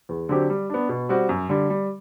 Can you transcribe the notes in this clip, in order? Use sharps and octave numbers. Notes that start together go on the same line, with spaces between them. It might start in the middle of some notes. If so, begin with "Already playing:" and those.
E2
D3 F#3 C4 G4
G3
B3 D4
B2
G3 C4 F#4
F#2
D3 G3
G3